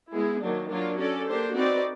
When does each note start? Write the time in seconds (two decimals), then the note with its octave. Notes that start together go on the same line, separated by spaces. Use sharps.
0.12 G#3 B3 E4 G#4
0.41 D#3 F#3 A#3 D4
0.69 F#3 A#3 D4 F4 A#4
0.98 C#4 F#4 A4 D5
1.27 A#3 D4 G4 C5
1.54 C4 D#4 F#4 B4 D5